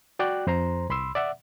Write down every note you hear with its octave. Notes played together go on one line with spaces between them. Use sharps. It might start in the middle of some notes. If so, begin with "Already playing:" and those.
F#4 D5 G5 F#6
F2 C5 A#5 C6
C2 B5 C6 E6
D5 E5 F#5